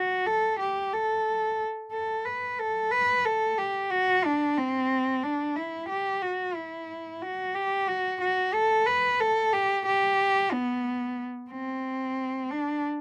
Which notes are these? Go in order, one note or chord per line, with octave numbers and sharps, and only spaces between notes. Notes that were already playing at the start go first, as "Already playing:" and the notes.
Already playing: F#4
A4
G4
A4
A4
B4
A4
B4
A4
G4
F#4
D4
C4
D4
E4
G4
F#4
E4
F#4
G4
F#4
F#4
A4
B4
A4
G4
G4
B3
C4
D4